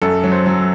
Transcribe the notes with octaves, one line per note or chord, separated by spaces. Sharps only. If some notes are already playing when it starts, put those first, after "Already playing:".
F#2 A4
F#3
C5
F#3